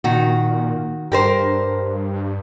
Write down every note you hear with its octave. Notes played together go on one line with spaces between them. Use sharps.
A#2 D#3 F#4
G2 G4 A#4 C5